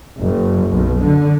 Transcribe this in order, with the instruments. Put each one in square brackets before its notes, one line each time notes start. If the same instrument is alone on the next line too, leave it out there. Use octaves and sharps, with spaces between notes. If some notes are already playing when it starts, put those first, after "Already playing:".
[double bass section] F#1
B1
D3